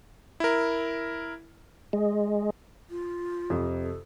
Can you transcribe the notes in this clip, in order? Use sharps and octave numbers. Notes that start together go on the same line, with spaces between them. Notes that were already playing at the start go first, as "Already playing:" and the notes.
E4 A#4
G#3
F4
F2 C3
A4